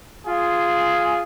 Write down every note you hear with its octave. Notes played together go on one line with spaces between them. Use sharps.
F4 G#4